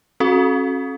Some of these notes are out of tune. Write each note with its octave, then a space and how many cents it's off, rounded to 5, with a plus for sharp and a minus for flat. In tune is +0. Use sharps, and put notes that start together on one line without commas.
C#4 -40 F#4 -10 A4 -30